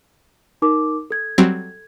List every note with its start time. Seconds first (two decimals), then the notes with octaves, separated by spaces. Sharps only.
0.62 D#4 A#4 D6
1.11 A4 G#6
1.38 F#3 G3 C4